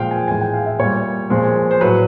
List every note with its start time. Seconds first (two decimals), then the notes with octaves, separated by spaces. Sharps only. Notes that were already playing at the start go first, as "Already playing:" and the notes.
Already playing: A#2 F3 G#3 F5 G5
0.11 G#5
0.28 A2 E3 G#3 G#5
0.41 G5
0.54 F5
0.66 E5
0.79 A#2 G3 C#5
1.30 A#2 F3 G#3
1.71 C5
1.81 A2 F#3 B4